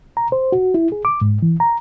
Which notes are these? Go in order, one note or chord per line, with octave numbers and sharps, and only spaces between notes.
A#5
C5
F#4
E4
G#4
D6
G#2
E3
A#5